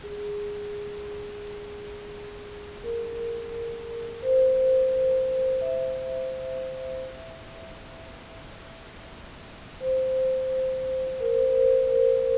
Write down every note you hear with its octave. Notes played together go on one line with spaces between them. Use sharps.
G#4
A#4
C5
E5
C5
A#4
C5
A#4
A#4